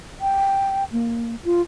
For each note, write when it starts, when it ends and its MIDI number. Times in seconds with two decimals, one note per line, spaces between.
0.21 0.84 79
0.92 1.35 58
1.44 1.61 65